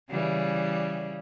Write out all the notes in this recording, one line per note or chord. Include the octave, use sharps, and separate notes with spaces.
C#3 E3 G3